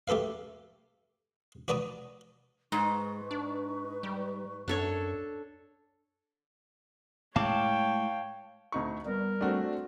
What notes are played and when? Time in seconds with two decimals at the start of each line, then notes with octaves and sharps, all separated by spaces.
0.08 A3 G4 A4 B4 F5
1.68 F#4 B4 D5 A5 A#5 D#6
2.72 G#2 G#3 D#4 B4 C#6
3.31 D4
4.03 G3
4.68 F#2 D4 A4 C#5
7.36 A2 G#3 C#5 F5 G5 A5 D6
8.72 D2 D#4 C#6
9.06 G3 B3 A#4
9.41 A3 C4 D4 F#4